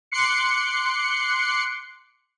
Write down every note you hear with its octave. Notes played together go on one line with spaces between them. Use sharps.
C6 D6 F#6 C7 C#7